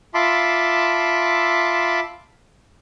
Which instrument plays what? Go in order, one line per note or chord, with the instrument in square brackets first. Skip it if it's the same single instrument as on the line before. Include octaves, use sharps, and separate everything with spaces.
[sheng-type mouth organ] F4 E5 A5 B5 C6 D6